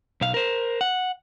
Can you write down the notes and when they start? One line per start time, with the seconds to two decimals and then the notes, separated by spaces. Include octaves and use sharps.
0.21 B1 F5
0.34 A#4 C5
0.81 F#5